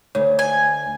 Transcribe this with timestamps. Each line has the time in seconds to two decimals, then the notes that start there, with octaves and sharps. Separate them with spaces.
0.15 D2 C#5
0.39 G#5